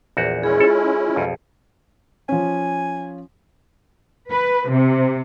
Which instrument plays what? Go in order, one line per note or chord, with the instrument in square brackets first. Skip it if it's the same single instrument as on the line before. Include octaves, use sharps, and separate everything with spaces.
[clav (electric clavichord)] A#1 E2 F#4
[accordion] G#3 C#4 E4 [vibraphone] G#4
[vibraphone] F4 [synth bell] G#4 [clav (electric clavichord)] A4
[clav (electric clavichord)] B1 F2
[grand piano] F3 C#4 [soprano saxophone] G#5
[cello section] B4
C3